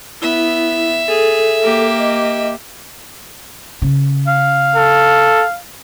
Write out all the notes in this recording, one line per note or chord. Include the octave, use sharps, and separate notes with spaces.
B3 E4 E5
G#4 A4
A#3 G4
D#5
C#3
F5
A4